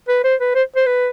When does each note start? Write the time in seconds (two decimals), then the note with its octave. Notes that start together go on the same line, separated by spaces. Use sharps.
0.09 B4
0.24 C5
0.41 B4
0.55 C5
0.76 C5
0.87 B4